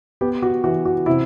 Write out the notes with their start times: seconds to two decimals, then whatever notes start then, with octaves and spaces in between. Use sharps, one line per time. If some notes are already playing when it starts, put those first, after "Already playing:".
0.21 B3 G4
0.42 F#4
0.64 E3 F#4
0.86 F#4
1.06 C3 E4